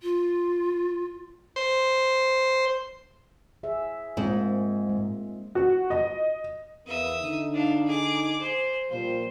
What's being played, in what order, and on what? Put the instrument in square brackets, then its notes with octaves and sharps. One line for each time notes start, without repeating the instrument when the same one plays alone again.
[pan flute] F4
[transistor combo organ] C5
[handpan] G#4 E5
[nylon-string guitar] G#2 [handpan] A#3 C4 F4
[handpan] G#3
[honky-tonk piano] F#4
D#5
[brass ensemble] E2 A#3 B3 [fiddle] E5 D#6
[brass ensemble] D3 D#4
[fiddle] D4 F5
G#4 D6
G#4 C5
[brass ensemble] A#2 F3 G3 [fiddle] C5